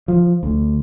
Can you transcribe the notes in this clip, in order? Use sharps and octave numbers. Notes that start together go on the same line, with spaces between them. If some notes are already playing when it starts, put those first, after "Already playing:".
F3
D2